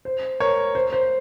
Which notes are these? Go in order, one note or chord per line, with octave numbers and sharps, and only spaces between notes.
C5
A#4 C#5
C5
C5